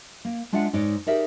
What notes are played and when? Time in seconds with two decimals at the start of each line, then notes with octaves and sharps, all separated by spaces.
0.25 A#3
0.53 G#3 D4 F4 D5 E5 F#5
0.73 G#2 D#4 C#5 D5
1.06 D#4 G4 G#4 A#4 D5 E5